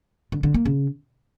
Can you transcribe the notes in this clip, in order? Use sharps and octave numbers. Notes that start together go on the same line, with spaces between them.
D3
D3
A#3
C#3